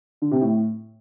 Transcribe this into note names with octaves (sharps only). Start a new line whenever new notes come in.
D3
C3
A2